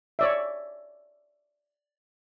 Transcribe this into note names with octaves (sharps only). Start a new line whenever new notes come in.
C#5 D5 E5